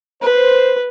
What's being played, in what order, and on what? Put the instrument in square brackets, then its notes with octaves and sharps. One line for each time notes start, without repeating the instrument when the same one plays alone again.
[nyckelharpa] B4 [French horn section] C5